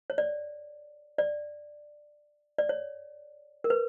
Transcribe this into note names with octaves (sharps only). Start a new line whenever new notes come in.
C#5
D5
D5
D5
C#5
A#4
B4